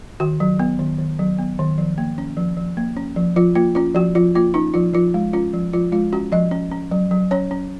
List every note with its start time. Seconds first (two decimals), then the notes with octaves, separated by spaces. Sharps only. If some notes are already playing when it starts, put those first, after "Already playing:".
0.20 D#3 F#4
0.40 F#3
0.59 B3
0.79 D#3
0.99 D#3
1.19 F#3
1.38 B3
1.59 D#3
1.78 F3
1.98 A#3
2.18 C#4
2.37 F3
2.57 F3
2.77 A#3
2.97 C#4
3.16 F3
3.36 F3 F4
3.55 A#3 F4
3.75 C#4 F4
3.95 F3 F#4
4.15 F3 F4
4.35 A#3 F4
4.54 C#4 D#4
4.74 F3 F4
4.93 F3 F4
5.14 G#3
5.33 C#4 F4
5.54 F3
5.73 F3 F4
5.92 G#3 F4
6.13 C#4 F#4
6.32 F3 D#5
6.51 C#4
6.71 C#4
6.91 F#3
7.11 F#3
7.31 C#4 C#5
7.51 C#4